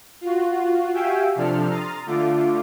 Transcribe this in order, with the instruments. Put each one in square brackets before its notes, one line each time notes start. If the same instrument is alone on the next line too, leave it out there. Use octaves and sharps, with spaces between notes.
[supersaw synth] F4 F#4
F#4 G4 E5 F5 G5 G#5
C3 F3 D4 A4 F6
A#5 C6 D#6 F6 A6
D3 A3 F4 D6